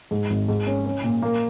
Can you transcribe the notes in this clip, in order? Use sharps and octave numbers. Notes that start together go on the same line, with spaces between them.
G#2
G#1
G#2
C#4
C#4
A#2
A#3